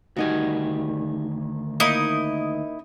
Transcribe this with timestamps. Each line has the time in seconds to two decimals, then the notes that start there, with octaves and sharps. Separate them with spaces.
0.16 D2 D#3 G3 D#4 F#4 G#5
1.80 A#3 D#4 E4 D#5